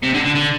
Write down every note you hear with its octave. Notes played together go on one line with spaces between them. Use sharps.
C3
D3
D3
D3